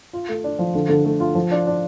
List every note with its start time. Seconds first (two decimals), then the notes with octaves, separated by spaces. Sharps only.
0.13 F4
0.29 A3
0.44 D4
0.59 F3
0.75 D3
0.89 D3
1.05 A3
1.20 F4
1.35 F3
1.51 D4
1.67 D4